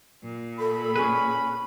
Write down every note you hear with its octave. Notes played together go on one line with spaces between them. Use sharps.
A#2
A4 B5
C#4 G#4 B4